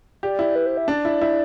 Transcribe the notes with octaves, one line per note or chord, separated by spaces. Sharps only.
G4 D5
E4
B4
C5
E5
D4 D5
E4
E4